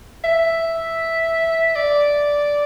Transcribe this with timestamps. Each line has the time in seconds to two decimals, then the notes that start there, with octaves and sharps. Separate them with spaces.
0.24 E5
1.76 D5